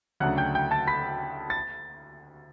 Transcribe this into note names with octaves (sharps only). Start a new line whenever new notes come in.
D2 C#3 F#3 A3 D4 F#5 F#6
G5 G6
G5 G6
A5 A6
B5 B6
A6